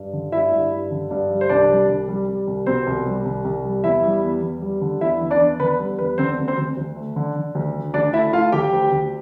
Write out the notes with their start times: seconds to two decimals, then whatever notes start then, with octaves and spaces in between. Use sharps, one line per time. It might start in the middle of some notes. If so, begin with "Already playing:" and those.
Already playing: G2
0.13 D3
0.32 G2 E4 E5
0.52 G2
0.71 G2
0.91 D3
1.11 G2
1.30 G3
1.41 C5
1.49 C2 D4 D5
1.69 G3
1.89 C2
2.08 G3
2.28 G3
2.47 C2
2.66 B2 C4 C5
2.87 C2
3.06 G3
3.25 C2
3.45 C2
3.65 G3
3.84 E2 E4 E5
4.03 G3
4.23 E2
4.42 E2
4.62 G3
4.81 D3
5.01 E2 E4 E5
5.21 E2
5.30 D4 D5
5.41 E2
5.60 D3 B4
5.79 G3
5.99 E2 B4
6.18 D3 C4 C5
6.38 D2
6.48 C4 C5
6.58 D2
6.77 D2
6.96 A3
7.16 D3
7.35 D3
7.55 D2
7.74 D3
7.94 D2 D4 D5
8.13 A3 E4 E5
8.33 A3 F4 F5
8.52 D2 G4 G5
8.72 D2
8.92 D2